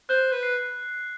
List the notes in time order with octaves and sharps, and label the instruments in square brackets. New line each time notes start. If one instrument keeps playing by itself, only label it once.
[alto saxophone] C5 [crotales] F#6
[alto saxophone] B4
[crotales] C7